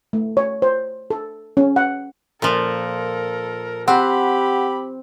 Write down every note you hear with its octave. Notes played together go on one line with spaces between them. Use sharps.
A3
C#5
C5
A4
C#4
F#5
A#2 F3 A4 A#4
C4 G4 F#5 B5